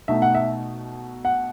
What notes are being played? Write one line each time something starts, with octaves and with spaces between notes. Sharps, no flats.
B2 A3 D#4 E5
F#5
E5
F#5